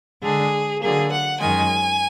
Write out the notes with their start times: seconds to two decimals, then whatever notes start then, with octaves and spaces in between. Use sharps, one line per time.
0.22 D3 G#3 D4 G#4
0.80 D3 F#3 A#3 G#4
1.10 F#5
1.39 F#2 D#3 G#3 G#5